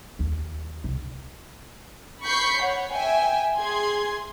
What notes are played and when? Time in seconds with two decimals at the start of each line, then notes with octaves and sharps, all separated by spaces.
0.19 D#2
0.84 C2
2.22 B5 C#6 G6 B6 C7
2.58 C#5 F#5
2.92 E5 G5 G#5
3.58 G#4 C6 G#6